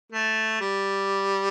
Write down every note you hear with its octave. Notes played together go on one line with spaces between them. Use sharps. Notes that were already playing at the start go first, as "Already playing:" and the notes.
A3
G3